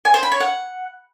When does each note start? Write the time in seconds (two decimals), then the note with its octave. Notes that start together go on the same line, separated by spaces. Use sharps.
0.05 G#5
0.14 C5
0.23 B5
0.32 C#5
0.40 F#5